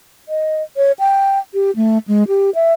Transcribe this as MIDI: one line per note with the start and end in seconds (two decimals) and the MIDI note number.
0.29 0.63 75
0.77 0.92 73
0.99 1.39 79
1.54 1.71 67
1.76 1.98 57
2.08 2.24 56
2.28 2.50 67
2.55 2.73 76